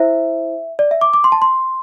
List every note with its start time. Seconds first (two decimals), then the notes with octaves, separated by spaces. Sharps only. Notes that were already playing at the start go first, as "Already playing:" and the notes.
Already playing: E4 C5 E5
0.79 D5
0.91 E5
1.01 D6
1.14 D6
1.24 C6
1.32 A5
1.42 C6